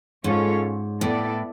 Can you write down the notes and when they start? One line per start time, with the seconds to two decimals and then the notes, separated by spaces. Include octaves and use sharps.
0.24 G#2 G#3 C#4 F4 A4 C#5
1.01 A2 B3 E4 A4 D5